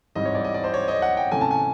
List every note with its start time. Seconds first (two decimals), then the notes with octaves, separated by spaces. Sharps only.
0.15 G#2 E3 G3 C4 D#5
0.25 C#5
0.35 D5
0.44 D#5
0.54 D5
0.64 C5
0.74 C#5
0.88 D#5
1.02 F#5
1.17 G5
1.31 C3 E3 A3 C#4 G#5
1.41 A5
1.51 G#5